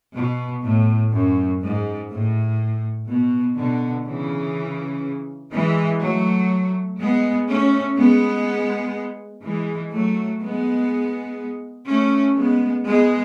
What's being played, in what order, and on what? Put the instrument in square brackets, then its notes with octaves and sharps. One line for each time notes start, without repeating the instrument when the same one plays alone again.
[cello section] B2
A2
F#2
G#2
A2
B2
B2 D3
C#3 E3
E3 G#3
F#3 A3
G#3 B3
A3 C#4
G#3 B3
E3 G#3
F#3 A3
G#3 B3
A3 C#4
G#3 B3
G#3 B3